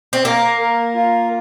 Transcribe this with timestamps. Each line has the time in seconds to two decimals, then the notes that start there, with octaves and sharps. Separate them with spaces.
0.13 C4
0.25 A#3 A#4
0.60 A#4
0.94 F4